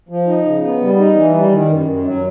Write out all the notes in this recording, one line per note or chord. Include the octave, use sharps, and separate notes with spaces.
F3
D#4
C#3
B3
G3
D#4
E3
G3
D#3
F#2
F#2
F#3